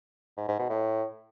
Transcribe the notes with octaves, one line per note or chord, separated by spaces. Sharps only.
G#2
G#2
B2
A2